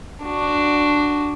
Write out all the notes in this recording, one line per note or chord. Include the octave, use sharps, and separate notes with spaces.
D4 F#4